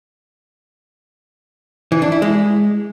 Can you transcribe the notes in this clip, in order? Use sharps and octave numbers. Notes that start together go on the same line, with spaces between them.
E3
D4
E4
G#3